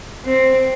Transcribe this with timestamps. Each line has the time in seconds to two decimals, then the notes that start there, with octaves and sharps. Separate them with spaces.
0.25 C4